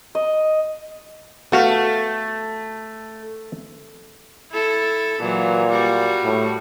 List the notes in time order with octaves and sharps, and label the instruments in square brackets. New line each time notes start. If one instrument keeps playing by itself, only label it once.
[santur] D#5
[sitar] A3 [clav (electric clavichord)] B3 F#4 F5
[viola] E4 A4
[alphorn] A#2 [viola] E3 F#3
[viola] G3 F#4
[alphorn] A2